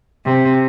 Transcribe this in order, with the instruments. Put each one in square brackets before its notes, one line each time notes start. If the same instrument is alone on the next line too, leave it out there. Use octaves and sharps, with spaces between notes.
[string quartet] C3